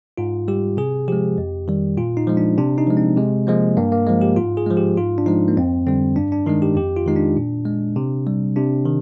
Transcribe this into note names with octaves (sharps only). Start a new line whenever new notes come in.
G#2 F4
G3 G4
C3 G#4
F3 G#3 G4
F2
D#3 G3
A#2 F4
D#4
F3 G#3
D4
C3 D4
D#4
F3 G#3
C4
C3 G#3
F3 G#3 A#3
G2 A#3
A#3
F3 G#3
G4
G#2 F4
G#4
F3 G#3
G4
G#2 F4
D4
F3 G#3 D#4
A#3
F2 C4
D3 G3 C4
G2 D4
D4
D#3 G#3 D#4
G4
F2 G4
F4
D#3 G#3 D#4
D4
A#2
G#3
C3
G3
C3 D4
D#3